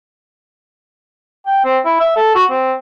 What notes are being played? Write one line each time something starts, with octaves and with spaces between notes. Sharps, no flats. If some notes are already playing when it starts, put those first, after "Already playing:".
G5
C4
E4
E5
A4
F#4
C4